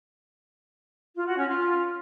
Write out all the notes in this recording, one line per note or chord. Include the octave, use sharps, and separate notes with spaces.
F4
F#4
C#4
F4